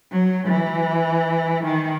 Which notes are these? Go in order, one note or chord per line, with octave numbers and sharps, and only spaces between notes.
F#3
E3
D#3